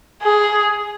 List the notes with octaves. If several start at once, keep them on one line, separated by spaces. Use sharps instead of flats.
G#4